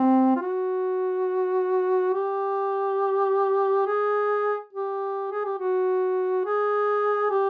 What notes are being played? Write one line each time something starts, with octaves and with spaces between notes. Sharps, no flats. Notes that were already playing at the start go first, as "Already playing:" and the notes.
Already playing: C4
F4
F#4
G4
G#4
G4
G#4
G4
F#4
G#4
G4